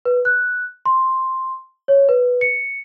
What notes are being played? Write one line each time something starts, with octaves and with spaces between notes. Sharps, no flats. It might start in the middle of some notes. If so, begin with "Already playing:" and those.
B4
F#6
C6
C#5
B4
C#7